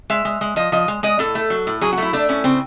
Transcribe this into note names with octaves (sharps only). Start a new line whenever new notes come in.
G#3 E5
G#3
G#3
F3 D#5
F3 D#5
G#3
G#3 D#5
A2 A4
A3
F#3
A2
F#3 G#4
F#4
A3 E4
A3 D4
A2 C#4
C#3 C4